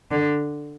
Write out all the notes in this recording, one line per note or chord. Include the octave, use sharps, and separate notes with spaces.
D3